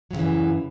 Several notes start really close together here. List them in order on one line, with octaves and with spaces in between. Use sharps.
F#3 A2 C#3 E3 F#2